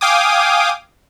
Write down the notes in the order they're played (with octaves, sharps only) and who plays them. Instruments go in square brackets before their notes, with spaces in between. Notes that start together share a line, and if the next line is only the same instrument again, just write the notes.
[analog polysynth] F5 G5 G#5 D6 D#6